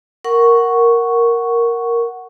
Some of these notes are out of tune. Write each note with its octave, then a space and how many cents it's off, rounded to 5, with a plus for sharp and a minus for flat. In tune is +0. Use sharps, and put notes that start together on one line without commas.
A#4 +0 F#5 +0 C#6 +0